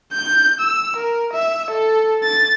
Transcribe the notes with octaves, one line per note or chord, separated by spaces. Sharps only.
G6
E6
A#4
E5
A4
A6